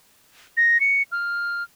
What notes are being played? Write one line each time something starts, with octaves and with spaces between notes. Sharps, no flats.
A#6
C#7
F6